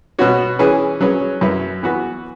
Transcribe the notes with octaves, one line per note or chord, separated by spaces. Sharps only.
B2 B3 F#4 C#5
E3 C#4 G#4 B4
F#3 C#4 G#4 B4
F#2 F#3 E4 B4
E3 B3 F#4 B4